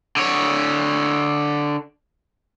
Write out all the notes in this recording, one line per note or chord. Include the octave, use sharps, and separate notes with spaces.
D3 C#5